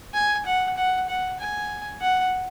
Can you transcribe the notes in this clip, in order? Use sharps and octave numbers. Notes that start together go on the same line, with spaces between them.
G#5
F#5
F#5
F#5
G#5
F#5